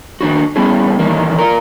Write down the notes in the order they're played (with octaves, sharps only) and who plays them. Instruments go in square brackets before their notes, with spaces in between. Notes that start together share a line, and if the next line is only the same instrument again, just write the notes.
[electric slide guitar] D#3 D4 F#4
G3 B3 C#4 E4 G#4
A#2 D#3 E3 G3 A#3
F4 A#4